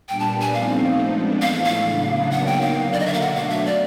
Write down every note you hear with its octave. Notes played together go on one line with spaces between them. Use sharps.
A#2 G3 B3 D4 G5
A5
G#5
F3 A3 C4 D#4 F5
F3 G#3 B3 D4
A2 E3 A3 F5
F5
C#3 F#3 B3 D4
F#3 A#3 D#4 F#5
G5
F5
D3 F#3 A#3
D5
D#5
E5
F5
B2 F#3 A3 D4 F#5
F5
E5
D5